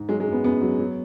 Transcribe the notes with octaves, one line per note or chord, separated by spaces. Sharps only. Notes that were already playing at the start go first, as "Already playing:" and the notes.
Already playing: G#2
F#3 G#3
G#3
F#2
B3
F#2 B3
F#3
F#3